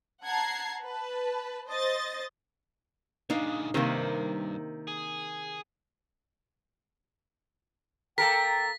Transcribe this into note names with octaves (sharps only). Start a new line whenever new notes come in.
F#5 A5 A#5 G#6 C7
B4 A5
C5 D#5 A6
A#2 C#3 D4 D#4 F5
G2 C3 D#3 A#3 C5
G#4
A#3 A4 A#4 G5 B6